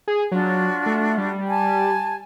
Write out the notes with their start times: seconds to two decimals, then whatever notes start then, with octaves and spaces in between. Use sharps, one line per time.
0.08 G#4
0.32 F#3 D4 F4 F#4
0.86 A3
1.18 G3
1.48 G#5 A5